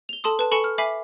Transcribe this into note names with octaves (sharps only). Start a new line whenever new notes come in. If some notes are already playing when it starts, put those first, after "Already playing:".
F7 G7
A4 A5 C6 D#6
B4 A5
A4 G#5 B5 C#6 C#7 E7
F6
E5 G#5 B5 D6 B6 C7